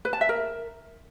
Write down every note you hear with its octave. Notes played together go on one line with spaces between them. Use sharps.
B4
A5
E5
A#4